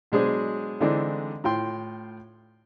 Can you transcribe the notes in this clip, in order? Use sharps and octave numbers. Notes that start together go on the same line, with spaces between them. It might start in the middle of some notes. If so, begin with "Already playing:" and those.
B2 F#3 G#3 D4 G#4 C5
D3 E3 G#3 C4 D4 D#4
A2 F4 G5 C6